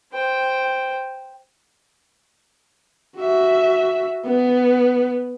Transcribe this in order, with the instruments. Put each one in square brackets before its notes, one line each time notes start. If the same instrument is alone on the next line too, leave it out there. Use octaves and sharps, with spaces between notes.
[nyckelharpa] C5 G5
[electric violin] F#4 E5
B3